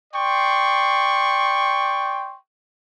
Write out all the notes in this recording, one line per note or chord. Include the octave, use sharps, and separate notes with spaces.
D5 G5 C6 C#6